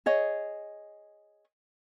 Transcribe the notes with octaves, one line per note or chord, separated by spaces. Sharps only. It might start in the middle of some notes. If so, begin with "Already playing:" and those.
G#4 C#5 D#5